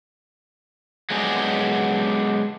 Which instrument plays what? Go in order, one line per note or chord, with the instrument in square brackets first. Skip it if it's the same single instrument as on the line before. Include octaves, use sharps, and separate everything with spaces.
[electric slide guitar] F#3 G#3 B3 D4 G4 G#4